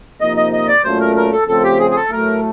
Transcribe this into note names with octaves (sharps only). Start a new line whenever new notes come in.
C3 F3 A#3 D#4 D#5
D#5
D#5
D5
A#2 F#3 A3 C#4 F4 C5
A#4
A#4
A4
C#3 F3 A3 C4 A4
G4
G#4
G#4
A4
A2 F#3 A3 A#4